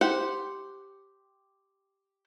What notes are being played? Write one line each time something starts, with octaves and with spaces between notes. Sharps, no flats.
G4 C5 F#5